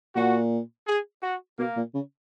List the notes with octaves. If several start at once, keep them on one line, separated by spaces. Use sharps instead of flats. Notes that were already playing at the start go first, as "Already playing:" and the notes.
A#2 F#4
G#4
F#4
B2 A#3
A#2
C#3